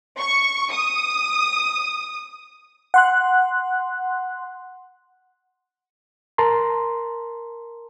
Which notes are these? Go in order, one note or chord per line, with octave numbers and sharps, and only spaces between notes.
C#6
D#6
F#5 C6 F#6
A#4 A5 A#5 C6